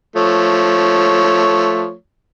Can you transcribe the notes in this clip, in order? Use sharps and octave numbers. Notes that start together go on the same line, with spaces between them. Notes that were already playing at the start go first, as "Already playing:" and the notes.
F3 A3 C#5